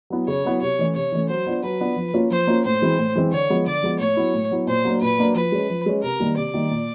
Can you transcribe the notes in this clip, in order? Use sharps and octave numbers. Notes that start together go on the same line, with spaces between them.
F#3 B3 E4
C#3 C#5
F#3 B3 E4
C3 C#5
E3 A3 C#4
C3 C#5
E3 A3 C#4
F#3 C5
B3 D4 F4
F#3 B4
B3 D4 F4
F3
A#3 C#4 F4
F3 C5
A#3 C#4 F4
A2 C5
E3 G#3 C4 E4
A2
E3 G#3 C4 E4
D3 C#5
F3 G#3 B3
D3 D5
F3 G#3 B3
A2 C#5
F#3 B3 E4
A2
F#3 B3 E4
A#2 C5
F#3 A#3 D4
A#2 B4
F#3 A#3 D4
F3 B4
G#3 C#4
F3
G#3 C#4
C3 A#4
D#3 G3 A#3
C3 D5
D#3 G3 A#3
A#2